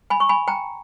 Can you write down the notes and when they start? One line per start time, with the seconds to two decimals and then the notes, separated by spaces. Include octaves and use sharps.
0.10 G#5 B5
0.20 C#6
0.29 G#5 B5
0.48 G5 A#5